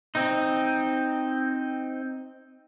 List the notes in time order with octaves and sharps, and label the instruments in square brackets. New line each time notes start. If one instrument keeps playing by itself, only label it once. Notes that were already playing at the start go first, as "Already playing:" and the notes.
[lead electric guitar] C4 D#4